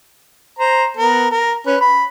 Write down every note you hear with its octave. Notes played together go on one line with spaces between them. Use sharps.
C5 A#5
B3 A#4
A#4
C#4 B4
B5